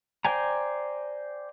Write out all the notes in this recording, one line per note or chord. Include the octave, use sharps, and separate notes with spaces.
C5 D5 G5 G#5 A#5